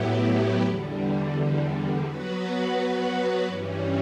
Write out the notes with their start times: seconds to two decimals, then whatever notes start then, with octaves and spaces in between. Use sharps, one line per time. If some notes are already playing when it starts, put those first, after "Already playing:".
Already playing: A2 F#3 B3 E4 G4
0.63 E2 D3 G3
2.04 F#3 B3 F#4 B4
3.46 G2 E3 G3 C#4